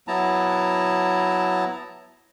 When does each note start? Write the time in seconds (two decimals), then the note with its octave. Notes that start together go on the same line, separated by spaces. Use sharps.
0.08 F#3 B3 E4 A5 A#5